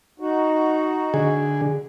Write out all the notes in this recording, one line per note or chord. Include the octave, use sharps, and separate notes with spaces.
D#4 F#4
D3 G#4